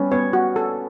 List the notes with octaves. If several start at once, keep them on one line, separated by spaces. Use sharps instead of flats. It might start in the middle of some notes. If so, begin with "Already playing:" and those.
Already playing: G3 B3 C#4
B3 C#5
F#4
A4